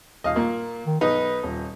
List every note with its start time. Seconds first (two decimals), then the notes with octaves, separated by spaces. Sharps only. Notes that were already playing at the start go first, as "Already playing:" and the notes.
0.24 D#1 D#5 F5
0.36 A#2 A#3
0.86 D#3
1.01 B1 D#4 B4
1.43 D#1